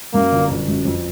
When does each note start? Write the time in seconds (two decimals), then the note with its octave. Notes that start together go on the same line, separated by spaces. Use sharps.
0.14 F#2 A#3
0.32 G1
0.50 G1
0.68 F#2
0.85 F2